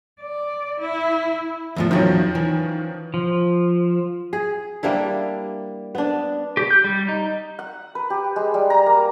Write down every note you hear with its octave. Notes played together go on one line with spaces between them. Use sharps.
D5
E4
E2 A2 F3
E2 D#3 F3 F#3 C#4
E3
F3
G#4
G3 A#3 D4 E4
B3 D4
G4
G6
G3
D#4
F#5
B4
G4
G#3
G3
A#5
A#3